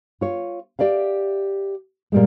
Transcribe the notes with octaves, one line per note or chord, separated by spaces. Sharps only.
F4 C#5
G4 D5 E5 F5
A#2 G3 G#3